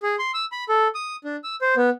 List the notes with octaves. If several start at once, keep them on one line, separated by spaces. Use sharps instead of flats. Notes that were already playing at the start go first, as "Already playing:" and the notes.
G#4
C6
E6
B5
A4
D#6
D4
E6
C5
B3